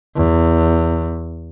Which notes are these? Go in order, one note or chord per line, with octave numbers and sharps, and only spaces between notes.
E2